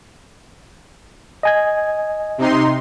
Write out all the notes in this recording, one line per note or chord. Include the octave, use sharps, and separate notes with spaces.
D#5 G#5 G#6
C3 D#4 C6